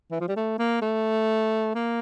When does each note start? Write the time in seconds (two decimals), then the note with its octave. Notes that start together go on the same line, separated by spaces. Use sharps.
0.11 E3
0.20 F3
0.29 G3
0.36 A3
0.59 A#3
0.82 A3
1.75 A#3